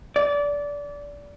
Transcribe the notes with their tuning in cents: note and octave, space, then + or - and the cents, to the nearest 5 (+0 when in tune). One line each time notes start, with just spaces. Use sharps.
D5 -20